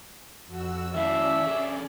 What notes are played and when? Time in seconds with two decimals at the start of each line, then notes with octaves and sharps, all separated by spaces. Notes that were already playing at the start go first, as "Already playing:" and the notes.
0.45 F2 F#4 E6
0.95 D#3 C#4 E4 D5 E5 F5
1.46 D3 G#4